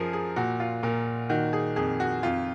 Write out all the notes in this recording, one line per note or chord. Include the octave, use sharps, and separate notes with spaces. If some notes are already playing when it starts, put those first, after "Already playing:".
Already playing: F#2 F3 G#4 A#4
G#4
A#2 F#4
F4
A#2 A#4
D#3 F#4
G#4
F2 G#4
F#4
F2 F4